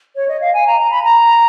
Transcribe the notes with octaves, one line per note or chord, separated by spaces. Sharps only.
C#5
D#5
F5
G#5
A#5
A#5
B5
A#5